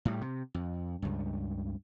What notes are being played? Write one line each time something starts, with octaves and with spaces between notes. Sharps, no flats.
A2 G3
C3
F2
C#2 G2